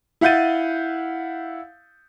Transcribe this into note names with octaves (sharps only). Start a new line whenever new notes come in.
E4 F5 F#5 G6 A6 D#7